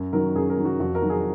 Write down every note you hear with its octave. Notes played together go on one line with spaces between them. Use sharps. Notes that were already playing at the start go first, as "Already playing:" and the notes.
Already playing: F#2
D#3 F#3 A#4
F#2 G#4
A#4
D#3 F#3
F#4
F2 F#4
A#4
D#3 F#3
G#4